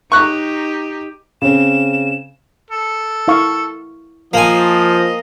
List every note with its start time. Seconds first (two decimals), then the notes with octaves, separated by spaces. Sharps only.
0.12 D#4 G4 C#6 F#6
1.42 C#3 C4 E7
2.71 A4
3.28 E4 F5 C#6
4.34 F3 A#3 D#5 G#5